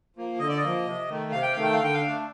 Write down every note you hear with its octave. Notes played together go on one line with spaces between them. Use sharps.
F3 A#3
D3 D#5
D5
D#5
F3 A#3
C3
D#3 A3
C3 F5
G5
D#3 A3 F5
G5
F5
D3 G5
F5
A3 D4